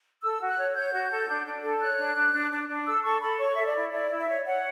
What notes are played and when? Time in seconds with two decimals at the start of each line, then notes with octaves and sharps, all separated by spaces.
0.22 A4 E6
0.39 F#4
0.48 F#6
0.57 C#5
0.75 C#5 G6
0.92 F#4
1.10 A4
1.27 D4
1.45 D4
1.62 A4
1.80 C#5 F#6
1.98 D4
2.16 D4
2.33 D4
2.51 D4
2.69 D4
2.86 A4 E6
3.04 A4 C#6
3.21 A4 B5
3.39 C#5 C#6
3.56 A4 E5
3.66 D5
3.74 E4
3.92 E4 D5
4.09 E4
4.19 E5
4.27 C#5
4.45 C#5 F#5